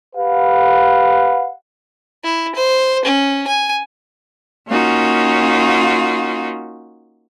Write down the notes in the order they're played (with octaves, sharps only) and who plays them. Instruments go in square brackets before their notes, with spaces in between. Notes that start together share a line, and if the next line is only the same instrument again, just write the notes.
[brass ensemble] G4 B4 F5 F#5
[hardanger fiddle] E4
C5
C#4
G#5
[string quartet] A#3 C#4 D#4 F4 F#4